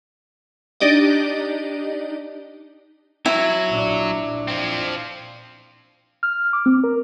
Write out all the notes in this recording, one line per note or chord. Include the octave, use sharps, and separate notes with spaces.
D4 D#4 G4 D5 D#5
F#3 E4
A#2 D4
F3 C4
F6
D6
C4
A#4